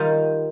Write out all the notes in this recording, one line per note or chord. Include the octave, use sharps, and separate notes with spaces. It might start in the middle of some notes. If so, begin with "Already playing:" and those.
Already playing: D#3 G3 D#4 F4